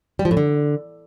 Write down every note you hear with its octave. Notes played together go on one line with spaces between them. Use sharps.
G3
F3
A2
D3